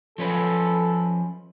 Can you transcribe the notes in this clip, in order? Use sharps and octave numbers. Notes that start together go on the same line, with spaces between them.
F3 C#4 A4 B4